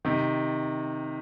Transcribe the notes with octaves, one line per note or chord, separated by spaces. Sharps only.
C3 D#3